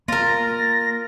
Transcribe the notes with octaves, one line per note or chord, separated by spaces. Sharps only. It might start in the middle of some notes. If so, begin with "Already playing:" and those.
A#3 F4 A#4 A6 A#6